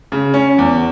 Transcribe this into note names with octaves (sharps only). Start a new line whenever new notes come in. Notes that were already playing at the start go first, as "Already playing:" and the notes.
C#3
C#4
E2